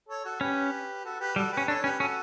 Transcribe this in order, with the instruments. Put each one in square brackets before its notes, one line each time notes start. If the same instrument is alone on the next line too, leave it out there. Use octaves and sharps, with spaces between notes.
[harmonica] A4 C#5
F#4 A4
[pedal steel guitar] C#4 [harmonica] G4 B4
[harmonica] F#4 A4
G4 B4
[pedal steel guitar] G3 [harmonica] F#4 A4
[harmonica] G4 B4
[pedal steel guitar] C#4
[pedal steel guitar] D4 [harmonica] A4 C#5
[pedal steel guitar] C#4 [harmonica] G4 B4
[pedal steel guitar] C#4 [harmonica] F#4 A4